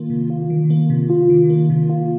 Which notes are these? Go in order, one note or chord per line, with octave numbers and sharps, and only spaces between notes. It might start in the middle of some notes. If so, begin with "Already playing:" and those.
Already playing: D#3 A#3 F4
C3
F4
D#3
A#3
C3
F4
D#3
A#3
C3
F4